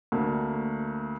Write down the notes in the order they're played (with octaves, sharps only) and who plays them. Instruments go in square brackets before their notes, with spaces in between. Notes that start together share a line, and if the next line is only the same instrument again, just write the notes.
[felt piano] D2 A3 A#3